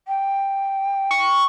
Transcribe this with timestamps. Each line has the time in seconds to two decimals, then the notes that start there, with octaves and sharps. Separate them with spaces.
0.08 G5
1.11 C#6